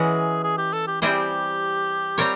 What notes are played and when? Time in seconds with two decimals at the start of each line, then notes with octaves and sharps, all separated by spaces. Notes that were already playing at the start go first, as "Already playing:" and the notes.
Already playing: E3 G#3 C#4 F#4 G#4
0.44 G#4
0.58 G4
0.73 A4
0.87 G4
1.02 G3 C4 E4 G4 G#4 C5
2.18 G3 C4 F4 A#4 C#5